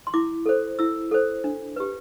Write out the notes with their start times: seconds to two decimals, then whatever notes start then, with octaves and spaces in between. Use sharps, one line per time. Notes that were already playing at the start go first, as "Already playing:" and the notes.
0.07 C6
0.14 E4 D6
0.46 A4 C5
0.79 E4 E6
1.11 A4 C5
1.44 D4
1.76 G4 B4